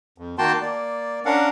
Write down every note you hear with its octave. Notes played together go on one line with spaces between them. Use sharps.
F2
D#3 A#3 F#4 G5 A5 C6
A#3 D5
C#4 D4 A#4 F5 F#5